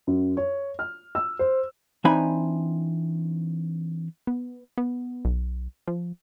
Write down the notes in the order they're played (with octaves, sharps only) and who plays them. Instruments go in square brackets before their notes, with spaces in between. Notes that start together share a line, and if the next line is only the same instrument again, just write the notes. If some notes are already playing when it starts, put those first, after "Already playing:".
[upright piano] F#2
C#5
F6
E6
C5
[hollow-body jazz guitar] E3 C4 D4 D#4 G#5 B5
[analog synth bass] B3
B3
B1
F3